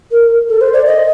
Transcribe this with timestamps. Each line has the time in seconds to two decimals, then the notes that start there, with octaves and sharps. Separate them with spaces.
0.11 A#4
0.49 A4
0.61 C5
0.73 D5
0.86 D#5